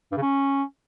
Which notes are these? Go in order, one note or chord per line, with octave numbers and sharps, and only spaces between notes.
G2
C#3
C#4